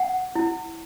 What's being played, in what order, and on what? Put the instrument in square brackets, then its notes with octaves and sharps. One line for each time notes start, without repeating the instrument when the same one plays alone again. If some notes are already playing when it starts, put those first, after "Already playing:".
Already playing: [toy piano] F#5
E4